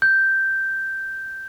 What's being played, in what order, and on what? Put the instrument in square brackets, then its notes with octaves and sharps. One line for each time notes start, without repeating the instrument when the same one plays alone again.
[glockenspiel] G6